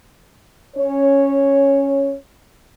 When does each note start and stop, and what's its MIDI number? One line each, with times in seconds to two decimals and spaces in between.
0.76 2.13 61
0.76 2.13 73